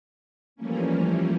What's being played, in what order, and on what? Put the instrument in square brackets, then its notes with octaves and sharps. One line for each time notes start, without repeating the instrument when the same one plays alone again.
[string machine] E3 F3 G3 A3 A#3 C#4